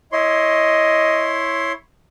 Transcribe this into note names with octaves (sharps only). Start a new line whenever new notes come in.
E4 C#5 D#5 C6